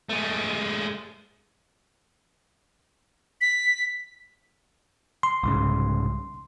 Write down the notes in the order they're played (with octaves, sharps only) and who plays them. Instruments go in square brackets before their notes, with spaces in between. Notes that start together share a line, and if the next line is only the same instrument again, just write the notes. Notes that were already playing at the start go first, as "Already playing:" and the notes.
[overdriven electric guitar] G#3 A3
[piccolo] B6
[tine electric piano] C6
[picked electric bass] C2 G#2 C#3